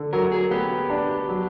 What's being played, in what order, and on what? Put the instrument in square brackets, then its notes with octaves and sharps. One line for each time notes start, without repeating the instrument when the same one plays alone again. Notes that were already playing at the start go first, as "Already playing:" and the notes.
Already playing: [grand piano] D3
[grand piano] F#3 [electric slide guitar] A#4
[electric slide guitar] G#4
[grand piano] B3 [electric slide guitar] G4
[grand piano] D4
F#3